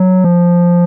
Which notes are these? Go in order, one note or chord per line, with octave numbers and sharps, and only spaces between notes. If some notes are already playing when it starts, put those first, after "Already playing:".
Already playing: F#3
F3